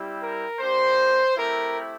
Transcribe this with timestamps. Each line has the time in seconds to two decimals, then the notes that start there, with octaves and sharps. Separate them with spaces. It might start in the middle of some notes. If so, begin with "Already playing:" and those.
Already playing: G3 C4 E4 G4
0.20 A#4
0.60 A#3 D4 G4 C5
1.36 A3 C4 E4 G4 A#4